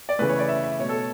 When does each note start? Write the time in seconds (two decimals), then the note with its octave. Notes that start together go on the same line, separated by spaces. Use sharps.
0.09 D5
0.19 C#3 E3 A3 B4
0.29 C#5
0.39 D5
0.48 E5
0.64 E5
0.80 B2 A3 C#5
0.89 A4